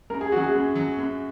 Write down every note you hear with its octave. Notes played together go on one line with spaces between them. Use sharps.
F#2 A#4
G#4
F#3 C#4 F#4
G#4
F#2
F#3 C#4
F#2